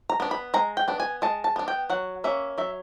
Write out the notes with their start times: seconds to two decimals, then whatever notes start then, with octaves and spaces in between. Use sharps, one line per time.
0.10 A#5
0.20 B3 D4
0.31 B5
0.54 G#3 A#5
0.77 G5
0.88 B3 D4
1.00 G#5
1.22 G#3 A5
1.44 A5
1.56 B3 D4
1.68 G5
1.90 F#3 F#5
2.24 A#3 C#4 E5
2.58 F#3 E5